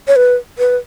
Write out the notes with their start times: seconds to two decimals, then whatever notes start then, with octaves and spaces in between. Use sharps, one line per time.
0.08 C#5
0.16 B4
0.58 B4